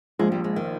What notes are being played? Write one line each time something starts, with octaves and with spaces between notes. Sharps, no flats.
A#1 A#2 F3 G#3
G3
G#3
D#3